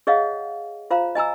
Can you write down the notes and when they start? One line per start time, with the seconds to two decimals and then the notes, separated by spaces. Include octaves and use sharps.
0.07 G#4 C#5 D#5 F5 F#5
0.91 F4 C5 F5 A#5
1.15 D#5 G#5 A#5 E6